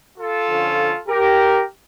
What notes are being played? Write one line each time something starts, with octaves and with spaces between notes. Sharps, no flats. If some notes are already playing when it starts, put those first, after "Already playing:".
F4 A4
D3 F3 C#4
G4 A#4